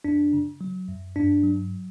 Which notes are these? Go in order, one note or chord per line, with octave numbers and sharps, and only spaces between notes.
F#2 D4
C#3
F#3
F#2
G2 D4
F#3